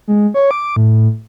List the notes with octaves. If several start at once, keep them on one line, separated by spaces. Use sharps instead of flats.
G#3
C#5
D6
A2